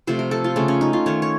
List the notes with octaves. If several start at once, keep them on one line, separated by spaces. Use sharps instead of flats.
C3 F3 A3 C5
A#4
A4
F4
C#3 A3 C#4
C#4
D#4
F4
D#3 A3 C#5
C#5